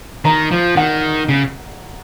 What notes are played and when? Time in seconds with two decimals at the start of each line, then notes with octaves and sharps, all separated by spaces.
0.25 D#3 A#5
0.51 F3
0.76 D#3 F#5
1.29 C#3